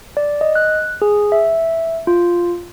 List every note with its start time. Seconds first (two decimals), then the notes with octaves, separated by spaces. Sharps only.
0.17 D5
0.41 D#5
0.55 F#6
1.02 G#4
1.32 E5
2.07 F4